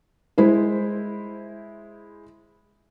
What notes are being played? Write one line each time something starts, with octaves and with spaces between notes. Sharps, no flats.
G#3 E4 C5